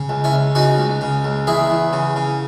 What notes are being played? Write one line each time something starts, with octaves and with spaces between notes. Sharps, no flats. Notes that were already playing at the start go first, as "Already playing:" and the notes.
Already playing: C#3
C#2
C#4 E4
C#2
C#3 D#4 F#4
C#2
C#3
C#2
E2 E4 G#4
E2
C#3
C#3